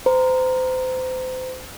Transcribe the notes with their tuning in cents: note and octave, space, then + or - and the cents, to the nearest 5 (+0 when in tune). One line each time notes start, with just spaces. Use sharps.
C5 -30 A#5 +0